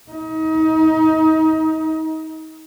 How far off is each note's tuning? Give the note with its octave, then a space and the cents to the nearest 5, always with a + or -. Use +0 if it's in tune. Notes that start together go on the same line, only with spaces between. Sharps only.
D#4 +30